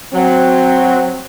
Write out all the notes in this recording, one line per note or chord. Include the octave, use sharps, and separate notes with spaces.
F#3 C4